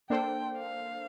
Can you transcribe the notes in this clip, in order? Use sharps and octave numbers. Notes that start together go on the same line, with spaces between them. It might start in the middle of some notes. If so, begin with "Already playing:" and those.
A#3 D4 A4 C5 G5
F5